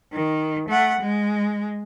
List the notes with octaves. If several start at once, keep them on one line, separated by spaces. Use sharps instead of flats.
D#3
A3 F#5
G#3